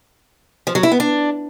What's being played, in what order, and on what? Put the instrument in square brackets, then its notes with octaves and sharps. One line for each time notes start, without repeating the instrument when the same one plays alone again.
[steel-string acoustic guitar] F3
F#3
E4
B3
D4